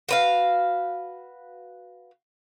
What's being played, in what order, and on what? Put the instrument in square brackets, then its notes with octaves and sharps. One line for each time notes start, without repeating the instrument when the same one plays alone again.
[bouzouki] F#4 B4 F5